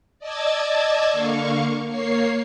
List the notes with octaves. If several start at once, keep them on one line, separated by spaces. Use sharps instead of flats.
D5 D#5 A5 D6 E6 G#6
D3 A#3 F5 C#6
A#3 C#5 C7